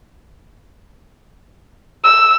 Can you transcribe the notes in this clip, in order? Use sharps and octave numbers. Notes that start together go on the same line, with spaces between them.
E6